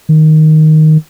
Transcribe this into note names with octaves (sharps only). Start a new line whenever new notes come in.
D#3